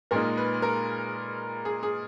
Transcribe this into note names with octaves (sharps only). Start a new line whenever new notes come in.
A#2 G#3 D#4 A#4
B4
A#4
G#4
G#4